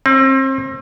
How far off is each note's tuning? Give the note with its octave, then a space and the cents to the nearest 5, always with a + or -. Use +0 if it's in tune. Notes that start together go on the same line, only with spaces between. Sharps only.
C4 +35